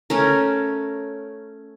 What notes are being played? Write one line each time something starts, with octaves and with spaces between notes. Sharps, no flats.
A3 C#4 A#4